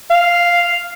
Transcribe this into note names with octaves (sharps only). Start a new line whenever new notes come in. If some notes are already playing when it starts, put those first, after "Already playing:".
F5